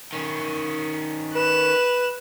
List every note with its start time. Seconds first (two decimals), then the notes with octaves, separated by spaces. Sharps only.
0.13 D#3 C#4
1.35 B4 F#6 E7